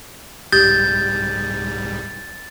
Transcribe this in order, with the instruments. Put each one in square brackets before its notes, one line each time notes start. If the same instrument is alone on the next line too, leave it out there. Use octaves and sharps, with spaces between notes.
[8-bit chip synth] C2 G#2 G3 [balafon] G4 [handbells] G6 [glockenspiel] A6